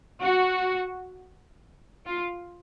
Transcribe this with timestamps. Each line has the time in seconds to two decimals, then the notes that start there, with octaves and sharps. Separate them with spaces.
0.21 F#4
2.06 F4